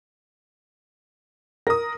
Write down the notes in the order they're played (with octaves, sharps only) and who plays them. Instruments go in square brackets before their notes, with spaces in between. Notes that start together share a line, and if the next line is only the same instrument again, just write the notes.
[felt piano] A#4 [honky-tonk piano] D#6 A#6